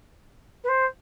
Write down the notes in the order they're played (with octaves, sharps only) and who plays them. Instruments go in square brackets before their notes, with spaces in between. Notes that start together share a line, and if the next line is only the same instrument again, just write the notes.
[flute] B4
C5